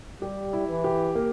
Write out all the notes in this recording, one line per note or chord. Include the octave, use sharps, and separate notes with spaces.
G3 G4
E4
E3
G4
A#3